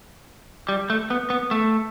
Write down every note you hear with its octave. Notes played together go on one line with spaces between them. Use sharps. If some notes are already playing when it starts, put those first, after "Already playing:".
G3
A3
B3
B3
A3